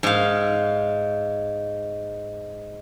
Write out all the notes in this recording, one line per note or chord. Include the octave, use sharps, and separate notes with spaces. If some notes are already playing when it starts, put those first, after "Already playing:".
G#2 F5